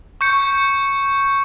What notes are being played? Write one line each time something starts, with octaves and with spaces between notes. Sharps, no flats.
C#6 G6 C#7